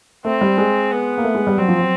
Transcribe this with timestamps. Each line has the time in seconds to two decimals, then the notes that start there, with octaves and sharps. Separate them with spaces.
0.25 A3 C4
0.41 G3
0.58 G#3
0.91 B3
1.18 A#3
1.24 A3
1.35 G#3
1.47 G3
1.58 F#3 C4
1.68 F3
1.79 F#3